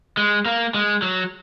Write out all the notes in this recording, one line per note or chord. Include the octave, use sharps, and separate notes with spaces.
G#3
A#3
G#3
F#3